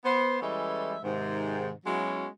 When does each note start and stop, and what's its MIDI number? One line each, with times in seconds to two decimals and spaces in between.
0.05 0.41 59
0.05 0.41 72
0.42 0.96 52
0.42 0.96 55
0.42 0.96 56
0.42 0.96 61
0.42 0.96 69
0.42 0.96 76
1.03 1.73 44
1.03 1.73 48
1.03 1.73 51
1.86 2.28 54
1.86 2.28 56
1.86 2.28 59
1.86 2.28 61
1.86 2.28 64
1.86 2.28 66